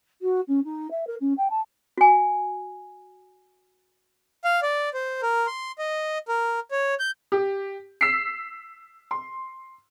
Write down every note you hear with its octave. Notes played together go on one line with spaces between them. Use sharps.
F#4
C#4
D#4
E5
A#4
C#4
G5
A5
F#4 G#5
F5
D5
C5
A#4
C6
D#5
A#4
C#5
G6
G4
E6 B6 C7
C6